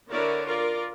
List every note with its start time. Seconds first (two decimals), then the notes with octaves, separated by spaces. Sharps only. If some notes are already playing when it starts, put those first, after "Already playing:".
0.10 D3 E4 F#4 A#4 C#5 D5
0.44 F4 A#4 D5